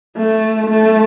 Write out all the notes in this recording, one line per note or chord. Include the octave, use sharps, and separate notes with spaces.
A3
A3